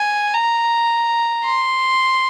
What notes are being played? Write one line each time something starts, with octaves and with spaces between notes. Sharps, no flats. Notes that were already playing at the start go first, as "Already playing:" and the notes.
Already playing: G#5
A#5
C6